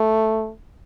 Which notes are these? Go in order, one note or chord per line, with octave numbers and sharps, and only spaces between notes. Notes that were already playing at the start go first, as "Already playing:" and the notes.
Already playing: A3